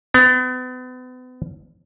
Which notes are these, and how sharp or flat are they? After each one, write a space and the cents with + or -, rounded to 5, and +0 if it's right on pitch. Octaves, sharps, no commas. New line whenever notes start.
B3 +40